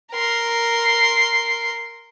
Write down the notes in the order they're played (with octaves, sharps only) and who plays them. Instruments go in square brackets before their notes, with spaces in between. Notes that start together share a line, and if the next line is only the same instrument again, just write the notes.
[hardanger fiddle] A#4 C6